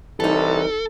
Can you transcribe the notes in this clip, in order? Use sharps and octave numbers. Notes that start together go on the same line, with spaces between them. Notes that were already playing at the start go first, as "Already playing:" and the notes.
C2 E3 D#4 A4